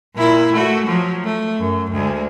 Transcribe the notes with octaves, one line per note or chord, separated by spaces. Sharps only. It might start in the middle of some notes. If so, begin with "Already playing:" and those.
A#2 E4
A3 F#4
F3 F#3
A3
F#2
D2 G#3